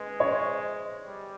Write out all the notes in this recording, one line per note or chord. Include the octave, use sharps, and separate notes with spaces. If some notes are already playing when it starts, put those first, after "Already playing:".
Already playing: G#3 B4
C#5
C5
G3